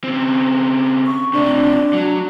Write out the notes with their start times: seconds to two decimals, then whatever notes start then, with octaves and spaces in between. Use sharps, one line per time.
0.04 C#3 C4
1.06 C#6
1.33 C3 A3 D4
1.93 F#3